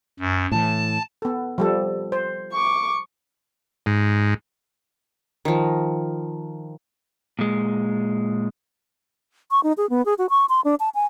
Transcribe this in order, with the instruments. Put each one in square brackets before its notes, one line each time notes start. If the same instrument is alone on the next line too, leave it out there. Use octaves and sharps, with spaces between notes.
[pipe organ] F#2
[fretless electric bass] A2 E3 [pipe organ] A5
[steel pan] B3 A4
F3 G3 A4
C5
[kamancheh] C#6 D6
[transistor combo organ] G#2
[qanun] D#3 F3
[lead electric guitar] A#2 G#3
[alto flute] C#6
D#4
G#4
B3
G#4
F#4
C#6
C6
D4
A5
G#5